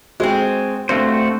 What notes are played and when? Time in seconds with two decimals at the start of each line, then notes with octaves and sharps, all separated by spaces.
0.20 G#3 C4 F#4 C5
0.89 G2 A3 C4 F#4 C5